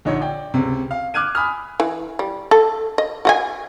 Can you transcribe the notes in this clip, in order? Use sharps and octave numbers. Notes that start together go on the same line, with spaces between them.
A#1 D3 D#4 C#5
D5 G5
C#2 C3
F5
D6 F6 F#6 G#6 D#7
G#5 B5 D#6 F6
E3
G3
A4
D#5
F#4 D#5 G#5